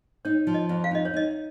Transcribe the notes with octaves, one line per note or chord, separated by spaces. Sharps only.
D#4 C#5
F3
D#5
F2
F5
D#4 D#5
C#5
D#4 D#5